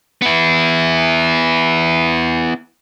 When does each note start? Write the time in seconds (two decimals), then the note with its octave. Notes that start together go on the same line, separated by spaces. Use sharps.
0.22 B3 E4